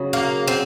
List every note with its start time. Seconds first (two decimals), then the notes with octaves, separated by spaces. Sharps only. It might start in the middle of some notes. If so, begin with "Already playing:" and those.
Already playing: C#3 F#3
0.13 A#3
0.48 C4